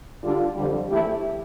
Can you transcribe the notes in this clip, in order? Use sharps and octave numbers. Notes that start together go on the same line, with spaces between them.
D3 G3 D4 F4
F2 D3 G3
E3 A3 E4 G4